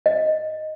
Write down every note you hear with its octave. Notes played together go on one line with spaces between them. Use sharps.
D#5